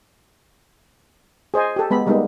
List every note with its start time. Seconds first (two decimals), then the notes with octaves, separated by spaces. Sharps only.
1.54 G#4 C5 D#5 G#5
1.76 G4 A4
1.91 G#3 B3 B5
2.07 G3 G#3 A#3 B3 D#4